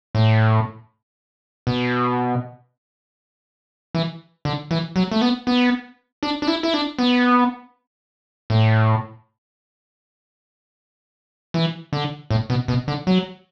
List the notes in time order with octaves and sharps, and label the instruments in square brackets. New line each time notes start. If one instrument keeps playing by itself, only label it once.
[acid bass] A2
B2
E3
D3
E3
F#3
A3
B3
B3
D4
D4
E4
E4
D4
B3
A2
E3
D3
A2
B2
B2
D3
F#3